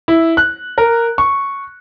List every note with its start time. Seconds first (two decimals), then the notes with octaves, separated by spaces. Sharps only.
0.08 E4
0.37 F#6
0.78 A#4
1.18 C#6